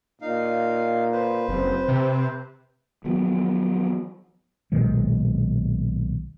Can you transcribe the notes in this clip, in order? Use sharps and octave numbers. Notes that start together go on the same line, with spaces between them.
A#2 D#4 F5
B4 C5
F#1 C4
C3
D#3 F3 F#3 B3
B1 A#2 D#3 G#3